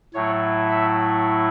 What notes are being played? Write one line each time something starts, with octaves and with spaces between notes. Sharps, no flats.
A2 F#3 A3 E4 C#5
E5